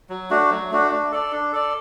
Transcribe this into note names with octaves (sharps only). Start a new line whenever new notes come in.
F#3
A3 D4 F#4
F#3
A3 D4 F#4
D4
A4 D5
D4
A4 D5